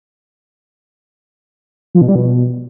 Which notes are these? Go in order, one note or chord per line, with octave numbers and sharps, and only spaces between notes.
F3
B2
G3
B2